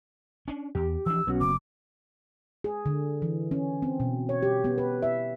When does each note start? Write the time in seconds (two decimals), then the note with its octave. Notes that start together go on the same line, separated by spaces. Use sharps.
0.48 C#4 D4
0.75 E2 G4
1.06 E3 F3 D4 E6
1.27 B1 B3 C#4 F#4
1.40 F#1 D6
2.64 G#4
2.86 D3
3.22 E3
3.51 C#4
3.82 C4
4.00 B2
4.29 C#5
4.43 G4
4.64 B3
4.78 B4
5.03 E5